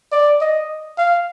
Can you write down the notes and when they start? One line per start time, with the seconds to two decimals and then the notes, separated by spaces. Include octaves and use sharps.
0.12 D5
0.41 D#5
0.98 F5